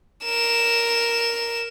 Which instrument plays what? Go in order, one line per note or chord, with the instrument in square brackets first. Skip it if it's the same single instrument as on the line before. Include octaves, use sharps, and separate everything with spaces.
[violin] A#4 E7